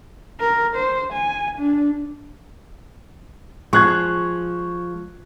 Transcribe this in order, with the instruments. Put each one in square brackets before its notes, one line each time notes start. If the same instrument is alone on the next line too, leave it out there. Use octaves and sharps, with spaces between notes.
[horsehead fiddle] A#4
C5
G#5
D4
[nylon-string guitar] F3 G#3 G#4 [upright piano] C#6 F#6 G#6